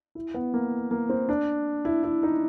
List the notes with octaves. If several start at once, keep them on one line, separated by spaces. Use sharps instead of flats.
E4
B3
A#3
A#3
C4
D4
E4
E4
D#4